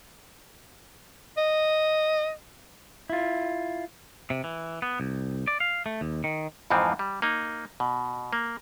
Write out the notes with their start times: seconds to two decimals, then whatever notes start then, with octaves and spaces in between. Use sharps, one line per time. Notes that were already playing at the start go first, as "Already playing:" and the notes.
1.37 D#5
3.10 E4 F4
4.30 C3
4.44 E3
4.82 B3
5.00 C2
5.47 D5
5.60 F5
5.86 A3
6.01 D#2
6.24 D#3
6.70 F2 G#2 E3 F3 C4
6.99 G3
7.22 A#3 D#4
7.80 B2
8.33 A#3